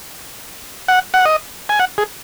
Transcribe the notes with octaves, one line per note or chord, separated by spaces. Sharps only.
F#5
F#5
D#5
G#5
F#5
G#4